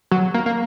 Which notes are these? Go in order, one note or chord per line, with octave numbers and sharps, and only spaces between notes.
F#3
A#3
A#3